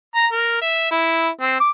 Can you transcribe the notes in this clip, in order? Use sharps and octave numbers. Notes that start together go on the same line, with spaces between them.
A#5
A#4
E5
E4
C4
D6